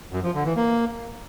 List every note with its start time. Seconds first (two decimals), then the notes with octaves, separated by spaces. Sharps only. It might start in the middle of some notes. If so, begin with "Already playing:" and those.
0.13 F#2
0.24 F3
0.34 D3
0.45 E3
0.56 A#3